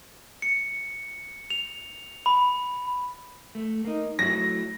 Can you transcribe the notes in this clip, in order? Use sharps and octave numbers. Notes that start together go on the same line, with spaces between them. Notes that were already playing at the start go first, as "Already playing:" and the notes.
C#7
F7
B5
A3
A#3 D#4
F#3 A3 E4 A#6